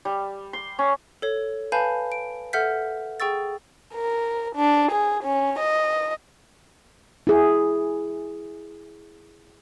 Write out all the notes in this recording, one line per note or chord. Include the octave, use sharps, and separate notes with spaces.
G3
C6
C#4
A4 C#5
B4 F5 G#5 A5 B5 G6
D7
A4 E5 F#5 F6 G6 B6
G#4 G5 C#6 E6 A6
A#4
D4
G#4
C#4
D#5
E4 G#4